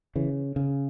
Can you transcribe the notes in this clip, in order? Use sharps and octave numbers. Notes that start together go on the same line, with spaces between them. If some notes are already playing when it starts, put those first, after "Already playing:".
C#3 E3
C#3